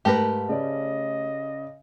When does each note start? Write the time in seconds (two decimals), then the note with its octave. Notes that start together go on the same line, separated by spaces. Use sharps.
0.05 G#2 A3 G4 A#4 B4 A5
0.49 C#3 C#4 D5 D#5